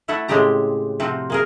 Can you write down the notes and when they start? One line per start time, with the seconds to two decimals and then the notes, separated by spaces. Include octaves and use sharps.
0.08 A3 E4 E5 F#5 A5
0.28 A2 C#3 G#3 C4 G4 A#5
1.00 C3 F3 C4 F#4
1.30 A#3 G#4 A#4